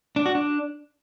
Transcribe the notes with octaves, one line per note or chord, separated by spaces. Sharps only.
D4
F#4
D4